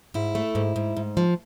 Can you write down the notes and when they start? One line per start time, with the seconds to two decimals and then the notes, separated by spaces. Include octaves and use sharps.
0.14 G#2 E4
0.35 A3
0.55 G#2
0.76 G#2
0.97 G#2
1.17 F3